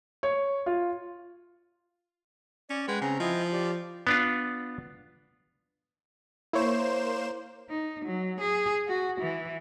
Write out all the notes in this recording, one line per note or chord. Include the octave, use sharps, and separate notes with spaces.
C#5
F4
C#4 D5
G#3 B4 F#5 G5
C#3 C4 C#4 A#5
F3 E4 D#5 G5
G4 D5
B3 D4 F4
A#3 E4 C5 C#5 E7
D#4
F#3
G#4
F#4
E3